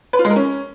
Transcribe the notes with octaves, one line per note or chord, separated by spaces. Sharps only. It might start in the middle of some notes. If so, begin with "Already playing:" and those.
B4
F4
G#3
A#4
C#4